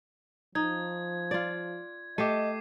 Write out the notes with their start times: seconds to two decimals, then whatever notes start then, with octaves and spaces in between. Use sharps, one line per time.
0.55 F3 D#4 G#6
1.31 F4 D5
2.18 A3 G4 D#5 D6 C7 D#7